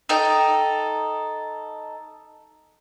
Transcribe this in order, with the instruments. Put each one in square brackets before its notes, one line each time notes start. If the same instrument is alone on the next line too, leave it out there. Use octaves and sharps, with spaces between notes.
[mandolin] D#4 A4 G5